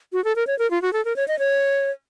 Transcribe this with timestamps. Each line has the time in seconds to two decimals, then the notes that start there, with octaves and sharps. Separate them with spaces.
0.13 F#4
0.24 A4
0.36 A#4
0.47 C#5
0.59 A#4
0.71 F4
0.82 F#4
0.93 A4
1.05 A#4
1.16 C#5
1.28 D#5
1.39 C#5